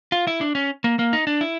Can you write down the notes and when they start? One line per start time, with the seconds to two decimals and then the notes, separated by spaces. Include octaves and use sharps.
0.12 F4
0.27 E4
0.41 D4
0.55 C#4
0.84 A#3
0.99 A#3
1.13 D#4
1.27 D4
1.41 E4